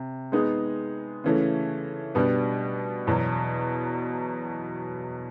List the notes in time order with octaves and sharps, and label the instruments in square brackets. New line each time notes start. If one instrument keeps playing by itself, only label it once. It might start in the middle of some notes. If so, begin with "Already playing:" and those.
Already playing: [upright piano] C3
G#3 B3 D#4 G#4
C#3 E3 A3 C#4
B2 G3 B3 D4
E2 B2 F#3